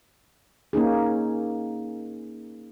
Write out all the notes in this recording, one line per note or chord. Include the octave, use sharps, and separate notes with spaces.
A#3 C#4 D#4 G#4